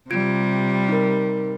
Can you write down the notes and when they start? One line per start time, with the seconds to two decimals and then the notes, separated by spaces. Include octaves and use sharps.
0.11 C3 G3 F4 G#6 D7
0.89 D#4 A#4